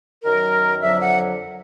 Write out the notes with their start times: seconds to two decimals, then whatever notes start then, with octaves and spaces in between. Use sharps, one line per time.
0.24 F#2 D#3 F#3 A#4
0.82 F2 D3 F#3 E5
1.02 F#5